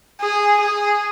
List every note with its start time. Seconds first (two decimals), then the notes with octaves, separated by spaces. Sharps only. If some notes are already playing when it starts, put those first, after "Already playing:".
0.20 G#4
0.61 G#4